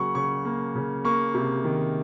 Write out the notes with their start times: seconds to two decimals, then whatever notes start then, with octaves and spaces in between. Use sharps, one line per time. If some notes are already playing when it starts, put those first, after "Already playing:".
Already playing: C#3 F#3 A#3 F#5 C#6
0.15 C#3 C#6
0.45 A#3
0.75 C#3
1.05 A#3 C#6
1.34 C3
1.64 D#3